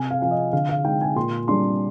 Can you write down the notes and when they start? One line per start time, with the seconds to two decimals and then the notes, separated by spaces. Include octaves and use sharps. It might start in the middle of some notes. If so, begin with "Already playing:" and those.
Already playing: C3 G#5
0.11 F5
0.21 F3 C4 F5
0.31 D#5
0.53 D3 F5
0.69 F5
0.84 G#3 D#4 G5
1.01 G#5
1.16 A#2 C6
1.48 G3 D4 C6